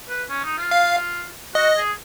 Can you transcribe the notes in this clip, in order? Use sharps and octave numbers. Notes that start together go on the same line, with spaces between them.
B4
C#4
D#4
F4
F5
F#4 D#5
G#4